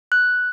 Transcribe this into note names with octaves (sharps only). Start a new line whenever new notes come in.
F#6